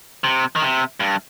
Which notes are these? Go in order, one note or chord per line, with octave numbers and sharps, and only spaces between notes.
C3
D#3
C3
G2